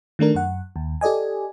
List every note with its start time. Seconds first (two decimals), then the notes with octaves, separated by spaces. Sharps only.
0.19 D#3 A3 D4 A#4
0.35 F#2 F#5
0.76 D#2
1.01 G4 A4 D5 D#5 G#5